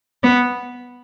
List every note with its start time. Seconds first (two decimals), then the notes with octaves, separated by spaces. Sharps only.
0.23 B3